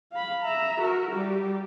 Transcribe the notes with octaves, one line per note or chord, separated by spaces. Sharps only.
F5 B5
E5 A#5
F#4 A#4
G3 G4